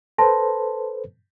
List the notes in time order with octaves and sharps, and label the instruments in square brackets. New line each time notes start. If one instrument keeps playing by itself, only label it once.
[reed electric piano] A4 B4 C5 [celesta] A5 C6 A#6